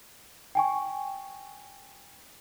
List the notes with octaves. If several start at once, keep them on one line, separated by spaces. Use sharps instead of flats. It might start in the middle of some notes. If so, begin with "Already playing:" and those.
G5 G#5 C#6